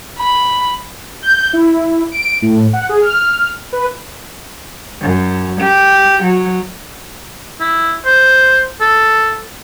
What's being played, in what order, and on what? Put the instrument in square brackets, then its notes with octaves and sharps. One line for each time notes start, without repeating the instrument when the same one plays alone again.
[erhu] B5
[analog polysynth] G6
E4
D7
A2
F#5
G#4
F6
B4
[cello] F#2
G4
F#3
[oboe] E4
C5
A4